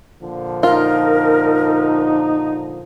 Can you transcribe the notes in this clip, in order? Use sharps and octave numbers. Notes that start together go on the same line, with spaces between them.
A#2 D3 F3
D#4 F4 A#4